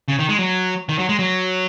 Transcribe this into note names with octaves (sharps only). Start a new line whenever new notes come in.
C#3
D#3
G#3
F#3
D#3
F#3
G#3
F#3